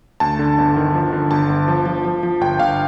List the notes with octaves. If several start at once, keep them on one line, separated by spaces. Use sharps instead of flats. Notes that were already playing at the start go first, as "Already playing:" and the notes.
D2 A5
D3
G1
D#3
F3
D3
G1 A5
G1
F3
F3
F3
F3
G1 G5
G1 F5